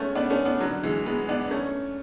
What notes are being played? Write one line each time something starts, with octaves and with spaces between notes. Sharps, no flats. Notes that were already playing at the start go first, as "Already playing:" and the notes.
Already playing: G#3 A3 B3 C#4
B3 D4
A3 C#4
B3 D4
D3 F#3
E3 G#3
G#3 B3
B3 D4
A3 C#4